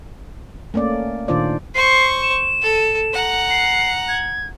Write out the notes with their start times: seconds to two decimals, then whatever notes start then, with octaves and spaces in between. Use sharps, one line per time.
0.74 A3 A#3 C#4 D5
1.28 A#2 D#3 D4 F4 C5 D5
1.75 C5 C#6 C7
2.23 E7
2.62 A4
3.13 F#5 A#5
3.50 C7
4.08 G#6